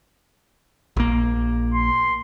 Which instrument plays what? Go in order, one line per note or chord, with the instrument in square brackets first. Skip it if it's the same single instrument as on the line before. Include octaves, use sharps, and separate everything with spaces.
[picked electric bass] A#1 A#3
[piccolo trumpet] C6